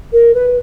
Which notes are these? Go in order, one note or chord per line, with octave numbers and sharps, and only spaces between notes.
A#4
B4